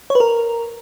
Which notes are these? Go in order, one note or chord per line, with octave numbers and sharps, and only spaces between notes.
C#5
B4
A#4